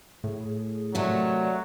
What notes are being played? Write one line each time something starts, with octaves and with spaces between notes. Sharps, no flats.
A2 G#4
C3 D#3 F#3 A3 D5